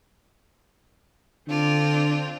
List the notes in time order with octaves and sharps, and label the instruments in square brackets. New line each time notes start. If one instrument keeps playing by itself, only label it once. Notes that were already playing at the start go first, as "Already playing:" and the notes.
[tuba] D3 [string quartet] C4 D4 F4